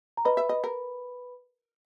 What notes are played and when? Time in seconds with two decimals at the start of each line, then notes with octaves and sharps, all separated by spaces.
0.17 A#5
0.25 B4 D#5 B5
0.37 E5
0.49 D#5
0.64 A#4